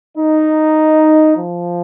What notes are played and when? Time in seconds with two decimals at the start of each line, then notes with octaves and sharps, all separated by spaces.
0.18 D#4
1.37 F3